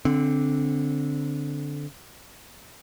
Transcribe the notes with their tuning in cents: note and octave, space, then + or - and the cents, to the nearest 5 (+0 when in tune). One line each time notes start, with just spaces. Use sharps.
D3 -10 C4 +0